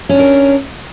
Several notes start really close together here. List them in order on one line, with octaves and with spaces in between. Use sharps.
C#4 D4 A#4